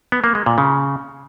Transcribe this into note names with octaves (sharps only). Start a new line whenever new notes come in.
B3
A#3
G#3
A#2
C#3